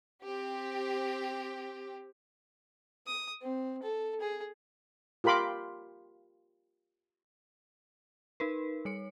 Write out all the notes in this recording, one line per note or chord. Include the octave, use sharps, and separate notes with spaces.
C4 G4
D#6
C4
A4
G#4
F4 G4 A#4 B5 C6 D6
D#4 A#4 B4
G3 C#5 C#7